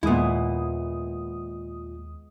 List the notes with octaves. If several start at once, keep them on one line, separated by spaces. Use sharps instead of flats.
D#2 A#2 G#3 B3 E4 D#6